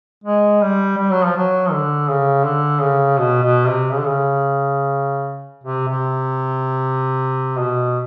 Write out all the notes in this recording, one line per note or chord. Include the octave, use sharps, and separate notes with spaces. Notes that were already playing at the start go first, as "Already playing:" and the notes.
G#3
G3
G3
F#3
F3
F#3
D3
C#3
D3
C#3
B2
B2
C3
C#3
D3
C#3
C3
C3
B2